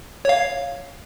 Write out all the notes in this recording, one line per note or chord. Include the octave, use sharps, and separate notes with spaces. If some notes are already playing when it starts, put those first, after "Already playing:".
C#5 F5